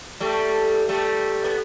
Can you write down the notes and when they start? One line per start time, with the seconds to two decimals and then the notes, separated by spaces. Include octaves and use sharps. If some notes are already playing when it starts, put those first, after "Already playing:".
0.20 G3 A3
0.89 G3 A3
1.44 B3